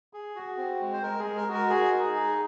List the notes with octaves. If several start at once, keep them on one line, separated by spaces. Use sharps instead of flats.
G#4
F#4
C4
G#3
C5
G#3 A#4
G#4
G#3
A#4
F#4
A#4
G#4
D#4
G#4